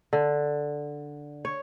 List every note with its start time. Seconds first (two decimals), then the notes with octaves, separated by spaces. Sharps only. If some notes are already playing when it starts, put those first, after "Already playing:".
0.13 D3
1.45 C#5